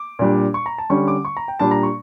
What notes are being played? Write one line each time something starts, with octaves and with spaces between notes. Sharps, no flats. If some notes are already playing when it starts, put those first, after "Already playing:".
Already playing: D6
A#2 G3 D4
C#6
A#5
A5
D3 G3 C#4 C#6
D6
C#6
A#5
G5
A#2 G3 D4 A5
A#5
C#6